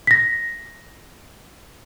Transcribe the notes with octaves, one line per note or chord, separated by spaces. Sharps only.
A#6 B6